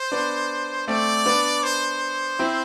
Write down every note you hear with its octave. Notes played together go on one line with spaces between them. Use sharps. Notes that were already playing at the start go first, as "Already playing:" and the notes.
Already playing: C5
B3 D4
A3 C4 D5
B3 D4
C5
C4 E4